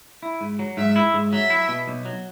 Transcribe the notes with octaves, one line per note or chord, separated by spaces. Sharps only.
E4
G#2
F#3
G#2 E5
E4
G#2
F#3 E5
E4
B2
B1
F#3